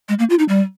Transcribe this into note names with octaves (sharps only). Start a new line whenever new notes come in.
G#3
A#3
F4
D#4
G3